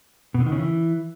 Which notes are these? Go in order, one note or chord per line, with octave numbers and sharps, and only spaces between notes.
B2
D3
D#3
C#3
E3